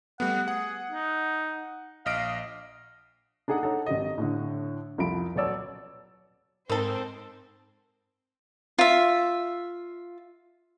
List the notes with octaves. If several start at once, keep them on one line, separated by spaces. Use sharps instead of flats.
G3 A3 B3 F#5
G#4 F#5
D#4
A#1 D#5 F5 D7
D4 D#4 G#4 A4 F#5
D#4 A4 C#5 F#5
G#1 G4 D#5
A2 D3
C2 F2 F4 B5 D7
D#1 B2 F#3 C#5 D5 E6
G#2 C4 D#4 A4 A#4 C5 B5
F4 E5